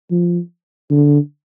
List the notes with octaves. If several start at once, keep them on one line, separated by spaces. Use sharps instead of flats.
F3
D3